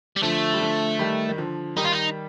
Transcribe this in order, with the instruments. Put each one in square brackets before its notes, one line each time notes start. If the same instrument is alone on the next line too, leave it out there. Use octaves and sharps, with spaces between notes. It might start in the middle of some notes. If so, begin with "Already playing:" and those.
[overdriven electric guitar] G3
[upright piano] D3 F3 [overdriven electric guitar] A3
[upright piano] G3
D3 F3
D#3 G3
D#3
D3 F3
[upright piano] D#3 G3 [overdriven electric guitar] D#4
[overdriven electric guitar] F4
D#4